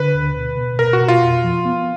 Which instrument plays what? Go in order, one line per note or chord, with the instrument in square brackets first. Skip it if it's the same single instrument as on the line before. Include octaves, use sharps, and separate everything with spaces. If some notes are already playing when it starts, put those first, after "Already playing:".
Already playing: [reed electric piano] D3 [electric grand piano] B4
[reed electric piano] D2
B2
B2
[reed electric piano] B2 [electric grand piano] A#4
[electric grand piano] F#4
[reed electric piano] B2
[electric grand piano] F4
[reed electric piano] F2
F3
B3